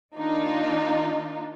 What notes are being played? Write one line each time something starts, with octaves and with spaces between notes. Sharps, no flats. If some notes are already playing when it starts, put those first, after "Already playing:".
D#3 A#3 D4 D#4 F4